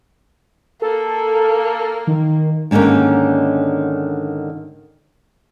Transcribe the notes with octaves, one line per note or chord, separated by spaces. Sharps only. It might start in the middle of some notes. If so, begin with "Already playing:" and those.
A#3 A4
D#3
G#2 D3 D#3 A#3 C#4